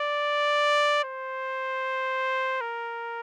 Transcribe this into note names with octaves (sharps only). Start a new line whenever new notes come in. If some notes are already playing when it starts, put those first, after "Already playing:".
Already playing: D5
C5
A#4